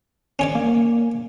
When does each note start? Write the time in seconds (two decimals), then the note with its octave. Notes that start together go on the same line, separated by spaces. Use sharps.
0.39 C#4 C#5 D5
0.55 A#3